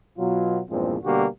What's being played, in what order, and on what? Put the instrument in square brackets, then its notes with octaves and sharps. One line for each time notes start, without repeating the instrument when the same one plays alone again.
[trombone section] B2 F#3 F4
E2 G2 A#2 F3 G#3 C4
B2 D3 G3 A#3 F#4 G4